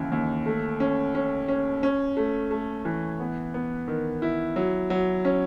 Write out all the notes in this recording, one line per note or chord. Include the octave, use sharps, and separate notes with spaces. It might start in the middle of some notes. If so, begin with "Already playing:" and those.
Already playing: D#2 C#3 E3
D#2
A3
C#4
C#4
C#4
C#4
A3
A3
E3
B3
B3
D#3
E4
F#3
F#3
C#4